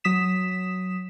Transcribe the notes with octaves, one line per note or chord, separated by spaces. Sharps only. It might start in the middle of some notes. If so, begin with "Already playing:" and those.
F#3 D#6 B6 E7